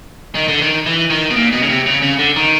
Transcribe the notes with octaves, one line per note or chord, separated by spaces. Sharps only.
D#3
D3
D#3
E3
D#3
B2
A#2
B2
C#3
C3
C#3
C#3
D3
D#3